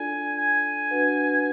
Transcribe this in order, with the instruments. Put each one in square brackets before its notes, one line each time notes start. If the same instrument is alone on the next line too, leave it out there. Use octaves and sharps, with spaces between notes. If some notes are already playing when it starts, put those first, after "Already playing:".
Already playing: [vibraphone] D4 F4 A4 D5 [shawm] G#5
[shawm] G#5
[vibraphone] D4 F#4 B4 F#5